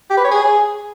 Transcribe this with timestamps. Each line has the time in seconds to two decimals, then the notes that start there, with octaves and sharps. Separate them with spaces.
0.10 G4
0.17 B4
0.24 C#5
0.31 G#4